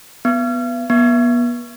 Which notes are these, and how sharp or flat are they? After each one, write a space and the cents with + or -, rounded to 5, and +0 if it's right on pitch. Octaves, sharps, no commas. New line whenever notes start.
B3 -5
B3 -35